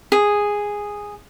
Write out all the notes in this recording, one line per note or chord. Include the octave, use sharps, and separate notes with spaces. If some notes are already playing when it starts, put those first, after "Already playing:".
G#4